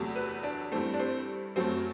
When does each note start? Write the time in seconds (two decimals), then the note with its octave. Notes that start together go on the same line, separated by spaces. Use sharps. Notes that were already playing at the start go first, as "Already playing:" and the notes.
Already playing: E2 C3 F#3 A3
0.16 B4
0.43 D4
0.72 G2 E3 A3 C4
0.94 D4
0.99 C4
1.56 F#2 F#3 A3 C4